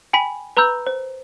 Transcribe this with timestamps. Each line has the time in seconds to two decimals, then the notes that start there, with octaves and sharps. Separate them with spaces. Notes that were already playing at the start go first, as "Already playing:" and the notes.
0.13 G5 G#5 B5 B6
0.57 B4 A#5 B5 E6 G6
0.87 C5